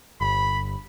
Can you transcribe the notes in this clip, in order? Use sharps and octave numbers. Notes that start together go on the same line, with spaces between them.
G1 B5